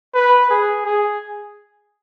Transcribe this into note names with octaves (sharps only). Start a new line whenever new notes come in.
B4
G#4
G#4